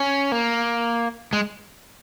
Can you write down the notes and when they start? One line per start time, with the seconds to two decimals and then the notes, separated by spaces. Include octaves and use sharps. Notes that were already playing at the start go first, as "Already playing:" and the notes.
Already playing: C#4
0.32 A#3
1.33 G#3